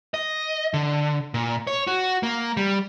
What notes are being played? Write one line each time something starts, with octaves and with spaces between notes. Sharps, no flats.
D#5
D3
A#2
C#5
F#4
A#3
G3